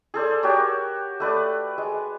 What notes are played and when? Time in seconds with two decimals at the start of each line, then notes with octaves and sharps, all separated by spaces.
0.14 G#4 A4 C5 D5
0.43 F#4 G4 A#4 C#5
1.20 A3 B4 D5
1.78 G#3